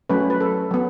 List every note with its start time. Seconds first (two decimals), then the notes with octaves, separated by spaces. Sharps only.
0.10 F#3 A3 C#4 B4
0.30 B4
0.41 A4
0.71 F#3 B3